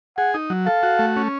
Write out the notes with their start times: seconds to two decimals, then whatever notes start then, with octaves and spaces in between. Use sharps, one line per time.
0.17 G#4 F#5
0.34 D#4
0.50 F#3
0.66 A4 F5
0.83 F#4
0.99 A3
1.16 C#4